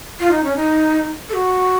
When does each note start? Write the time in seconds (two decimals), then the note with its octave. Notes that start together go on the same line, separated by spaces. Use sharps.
0.20 F4
0.31 D#4
0.44 C#4
0.56 D#4
1.29 A4
1.33 F#4